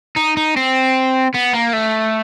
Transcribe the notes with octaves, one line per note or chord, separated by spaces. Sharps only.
D#4
D#4
C4
B3
A#3
A3